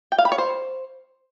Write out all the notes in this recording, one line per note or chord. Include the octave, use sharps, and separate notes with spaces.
G5
F5
B5
C#5
C5